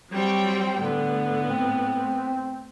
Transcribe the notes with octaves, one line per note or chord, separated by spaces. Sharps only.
F#3 G3 C4 G5
A2 D3 B3
C4